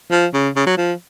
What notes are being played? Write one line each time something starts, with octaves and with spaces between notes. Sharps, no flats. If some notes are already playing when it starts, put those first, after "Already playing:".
F3
C#3
C#3
F#3
F3